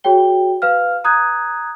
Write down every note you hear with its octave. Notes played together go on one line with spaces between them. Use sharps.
F#4 G#4 C#5 G5 G7
B4 F5 F6
A#5 D#6 F#6 G#6